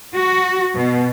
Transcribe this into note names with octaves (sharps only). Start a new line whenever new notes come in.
F#4
B2